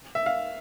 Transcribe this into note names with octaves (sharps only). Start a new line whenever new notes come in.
E5
F5